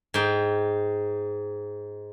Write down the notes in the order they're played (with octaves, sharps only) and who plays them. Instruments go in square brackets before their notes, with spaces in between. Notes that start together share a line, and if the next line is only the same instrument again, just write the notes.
[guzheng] G#2 G5